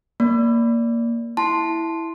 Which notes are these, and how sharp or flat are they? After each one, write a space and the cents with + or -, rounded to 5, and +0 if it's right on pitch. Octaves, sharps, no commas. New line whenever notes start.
A#3 +0 D5 -20
E4 +0 A5 +0 C6 +0